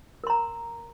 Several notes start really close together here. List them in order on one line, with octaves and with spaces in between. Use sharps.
A#4 C6 A#5